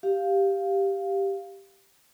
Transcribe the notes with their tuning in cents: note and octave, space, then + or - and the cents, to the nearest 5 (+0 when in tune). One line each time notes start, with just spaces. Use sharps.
G4 +0 F5 +0